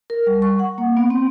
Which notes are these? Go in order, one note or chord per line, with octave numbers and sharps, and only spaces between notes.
A#4
G3
C#6
F#5
A#3
B3
C4